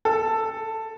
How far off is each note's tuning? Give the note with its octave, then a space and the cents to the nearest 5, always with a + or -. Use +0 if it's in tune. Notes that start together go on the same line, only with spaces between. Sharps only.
A4 +15